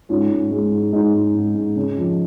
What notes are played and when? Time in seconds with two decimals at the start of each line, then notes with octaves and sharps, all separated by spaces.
0.09 G#2 C#4 F4
0.30 G#2
0.51 G#3
0.72 G#2
0.93 G#2 D#4 G#4
1.14 G#2
1.35 G#2
1.55 G#2
1.76 C#3
1.97 F2